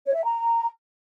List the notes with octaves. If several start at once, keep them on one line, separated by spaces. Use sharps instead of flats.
C#5
E5
A#5